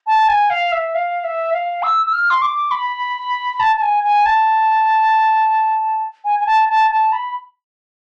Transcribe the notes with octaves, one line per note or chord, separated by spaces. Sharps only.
A5
G#5
F5
E5
F5
E5
F5
E6
E6
F6
C6
D6
B5
A5
A5
G#5
G#5
A5
G#5
G#5
A5
A5
A5
B5